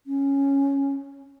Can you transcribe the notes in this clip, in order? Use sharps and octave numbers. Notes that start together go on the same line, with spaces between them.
C#4